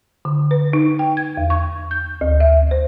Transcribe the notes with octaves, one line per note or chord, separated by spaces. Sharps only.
D3
B4
D#4
G5
G#6
E2
C#6
G6
D2
E5
C5